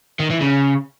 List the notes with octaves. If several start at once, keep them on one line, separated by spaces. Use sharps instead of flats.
D#3
E3
C#3